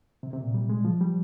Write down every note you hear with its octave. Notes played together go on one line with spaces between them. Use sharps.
C3
C3
A#2
G3
G#3
F3
G3